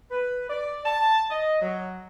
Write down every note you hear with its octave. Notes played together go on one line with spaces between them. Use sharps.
B4
D5
A5
D#5
F#3